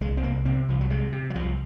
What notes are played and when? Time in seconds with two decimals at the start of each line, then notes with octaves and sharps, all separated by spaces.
0.01 C2 G#3
0.17 C4
0.23 C2 A#3
0.45 C3 C4
0.68 C2 F3
0.81 F#3
0.90 C3 G#3
1.12 C3
1.30 F#3
1.35 C2 F3